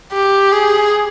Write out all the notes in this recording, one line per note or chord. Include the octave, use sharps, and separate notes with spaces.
G4
G#4